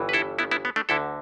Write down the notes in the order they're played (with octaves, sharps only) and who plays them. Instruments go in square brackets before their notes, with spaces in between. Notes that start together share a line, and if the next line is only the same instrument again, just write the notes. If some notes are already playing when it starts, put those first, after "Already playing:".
Already playing: [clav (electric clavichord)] G1 G2 E3
B4
E4 A4
B3 E4
B3 E4
B3
A3 D4
D2 D3 E4 A4